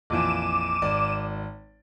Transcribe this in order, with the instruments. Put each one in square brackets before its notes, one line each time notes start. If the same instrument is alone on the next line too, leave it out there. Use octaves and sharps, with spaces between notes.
[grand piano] A#1 F2 E3 [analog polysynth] D6 D#7 E7
[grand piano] G#1 D5